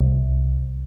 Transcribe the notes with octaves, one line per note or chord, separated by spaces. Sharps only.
C2